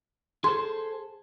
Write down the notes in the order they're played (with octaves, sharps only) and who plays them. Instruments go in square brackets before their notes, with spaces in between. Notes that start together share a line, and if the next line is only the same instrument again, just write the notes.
[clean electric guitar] G#4 A4 C5 [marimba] C6